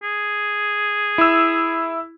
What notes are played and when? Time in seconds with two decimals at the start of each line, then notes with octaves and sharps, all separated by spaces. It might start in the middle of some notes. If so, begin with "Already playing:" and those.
0.03 G#4
1.18 E4 E6